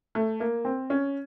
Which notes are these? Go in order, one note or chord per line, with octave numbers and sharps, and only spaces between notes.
A3
A#3
C4
C#4